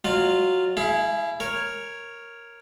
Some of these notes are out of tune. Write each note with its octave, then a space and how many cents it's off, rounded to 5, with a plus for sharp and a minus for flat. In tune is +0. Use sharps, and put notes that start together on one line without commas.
F#3 +0 F4 +0 D#5 -45
E4 +0 G#4 +25 F5 -45
A#4 +0 C#5 -5